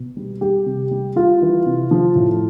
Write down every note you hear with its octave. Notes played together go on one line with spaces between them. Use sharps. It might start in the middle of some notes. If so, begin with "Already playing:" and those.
Already playing: B2
G3
G3 G4
C3
G3
G3 F4
E3
C3
F3
A2